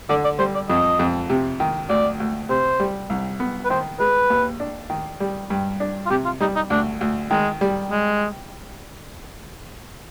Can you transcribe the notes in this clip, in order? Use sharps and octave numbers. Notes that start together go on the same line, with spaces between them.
D3 D5
D5
G3 C5
D5
F2 D#5
F2
C3
D#3
D2 D5
D2
C3 C5
G3
C2
B3
B4
D#3 C5
G#3 B4
D#2
D4
D#3
G3
G2
D4
F4
C3 G4
F4
G3 D#4
D#4
D2 D4
D2
D#3 G#3
G3
G#3